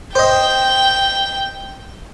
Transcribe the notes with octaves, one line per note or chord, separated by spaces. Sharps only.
C5 D#5 G5